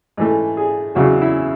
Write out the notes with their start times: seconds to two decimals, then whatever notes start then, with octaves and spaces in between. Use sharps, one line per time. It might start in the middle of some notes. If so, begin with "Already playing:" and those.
0.17 G#2 E3 A3
0.57 G#4
0.95 E2 C#3 F#3 F#4
1.22 E4